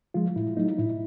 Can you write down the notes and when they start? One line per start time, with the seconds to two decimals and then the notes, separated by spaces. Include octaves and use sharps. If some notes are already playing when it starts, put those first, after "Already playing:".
0.14 F3 G#3 F4
0.36 A2 E4
0.57 F#3 A3 D#4
0.72 D#4
0.78 A2 E4